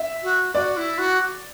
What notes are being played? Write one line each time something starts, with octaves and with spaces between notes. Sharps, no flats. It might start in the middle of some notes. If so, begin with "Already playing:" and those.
Already playing: E5
F#4
F#4 D5
E4
F#4